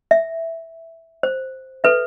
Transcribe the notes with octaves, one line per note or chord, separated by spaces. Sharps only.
E5
C5
A4 B4 E5